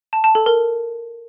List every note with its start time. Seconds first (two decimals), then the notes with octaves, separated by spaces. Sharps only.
0.13 A5
0.24 A5
0.35 A4
0.46 A#4